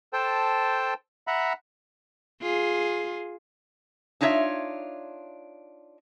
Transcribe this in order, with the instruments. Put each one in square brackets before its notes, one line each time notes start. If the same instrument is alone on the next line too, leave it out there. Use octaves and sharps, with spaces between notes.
[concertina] A4 C5 G5 A5
E5 F#5 A#5 B5
[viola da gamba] F4 G#4
[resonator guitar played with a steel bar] D4 D#4 F4 C#5 E5